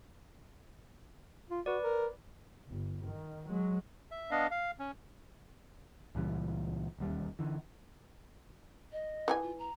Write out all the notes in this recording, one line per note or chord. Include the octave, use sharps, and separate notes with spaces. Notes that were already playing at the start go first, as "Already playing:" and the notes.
F4
F#4 B4 D5
A#4
G1
D#3
F#3 G#3
E5
B3 D4 D#5 F5
F5
C#4
C#2 A#2 E3 G3
E1 D#2 G3
D3 E3
D#5
E3 D#4 G#5
F4
A#5